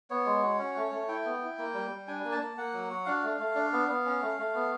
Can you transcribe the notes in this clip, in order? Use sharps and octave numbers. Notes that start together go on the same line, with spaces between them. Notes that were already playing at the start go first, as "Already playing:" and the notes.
B3 C#5
G#3
F#4
C#4
A3
A3
E4 G5
B3
E4
A#3
G3
G3
D4 G#5
A#3
A5
A#3
A#3 F#5
F#3
F#4
D4 F5
A3
A3
D4
B3
B3
C#4
A3
A3
B3